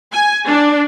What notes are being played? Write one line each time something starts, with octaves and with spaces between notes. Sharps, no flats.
G#5
D4